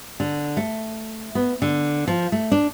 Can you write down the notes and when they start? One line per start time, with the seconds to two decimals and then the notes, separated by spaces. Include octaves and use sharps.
0.20 D3
0.57 A3
1.35 B3
1.62 D3
2.08 F3
2.32 A3
2.52 D4